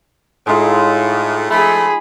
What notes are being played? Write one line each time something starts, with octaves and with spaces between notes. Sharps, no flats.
A2 G#3 D#4 F4
F3 A3 G#4 B5